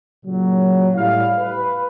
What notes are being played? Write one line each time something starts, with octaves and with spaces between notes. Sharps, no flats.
A#2 C#3 F#3
A2 G3 E4 F5
B4